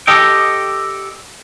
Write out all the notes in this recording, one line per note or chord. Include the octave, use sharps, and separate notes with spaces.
G4 A4 D#5 G5